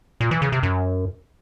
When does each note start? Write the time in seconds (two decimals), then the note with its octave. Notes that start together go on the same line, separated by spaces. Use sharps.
0.21 A#2
0.31 E3
0.42 C#3
0.52 C3
0.63 F#2